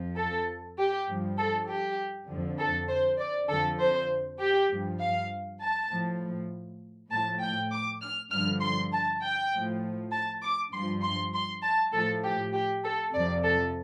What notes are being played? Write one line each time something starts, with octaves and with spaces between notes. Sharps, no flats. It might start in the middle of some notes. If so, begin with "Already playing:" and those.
Already playing: F2 F3
A4
G4
G2 F3
A4
G4
F2 D3 F3
A4
C5
D5
F2 D3 F3 A4
C5
G4
G2 F3
F5
A5
A2 F3
A2 F3 A5
G5
D6
F6
G2 D3 F3 F6
C6
A5
G5
A2 F3
A5
D6
G2 F3 C6
C6
C6
A5
A2 F3 A4
G4
G4
A4
F2 C3 F3 D5
A4